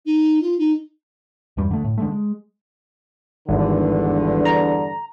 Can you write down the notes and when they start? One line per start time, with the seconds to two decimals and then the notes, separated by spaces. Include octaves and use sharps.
0.06 D#4
0.42 F4
0.59 D#4
1.57 E2 G2 G3
1.71 D3 A3
1.84 A2
1.98 D3 G#3 A3
2.11 G#3
3.49 G#1 E2 G2 D3
4.45 A#5